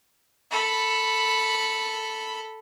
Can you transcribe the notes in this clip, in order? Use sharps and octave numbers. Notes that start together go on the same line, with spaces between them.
A4 B5